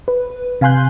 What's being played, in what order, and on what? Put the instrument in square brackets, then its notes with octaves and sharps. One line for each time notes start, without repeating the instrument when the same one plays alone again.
[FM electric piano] B4
C3 F5 G#5 C6 F#6 G6